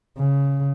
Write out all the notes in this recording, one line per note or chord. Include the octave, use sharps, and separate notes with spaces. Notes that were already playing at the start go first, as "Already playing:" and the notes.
C#3